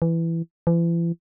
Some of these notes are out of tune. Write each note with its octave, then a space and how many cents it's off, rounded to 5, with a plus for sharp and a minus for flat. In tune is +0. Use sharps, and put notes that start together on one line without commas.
E3 +10
E3 +40